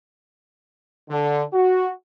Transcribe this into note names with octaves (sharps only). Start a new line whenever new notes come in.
D3
F#4